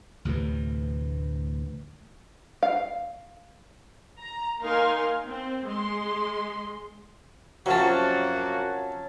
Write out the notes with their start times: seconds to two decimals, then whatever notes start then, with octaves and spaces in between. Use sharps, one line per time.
0.25 D2 A2 C3 E3
2.63 F5
4.19 A#5
4.61 A#3 D#4 A#4 F5 G#5 C6
5.26 C4
5.66 G#3 C6
7.66 F#2 C3 F3 F#3 A#3 C#4 F#4 A5